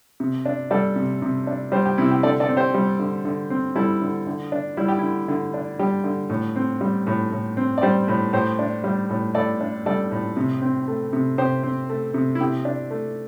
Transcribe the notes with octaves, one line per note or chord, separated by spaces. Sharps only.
C3
D4
G3 A4 D5
C3
C3
D4
G3 G4 C5
G4
C3 E4
G4
D3 A4 D5
A4 D5
C4
G4 C5
G3
D3
D3
C4
G3 E4 A4
D3
D3
D4
G3 E4
G4
D3 E4
D3
D4
G3 G4
D3
A2
C4
G3
A2
A2
C4
D5
G3 G4 C5
A2
A2 G4 C5
D4
G3
A2
A2 A4 D5
D4
G3 A4 D5
A2
C3
C4
A3
C3
C3 G4 C5
C4
A3
C3
E4
C3 G4
D4
A3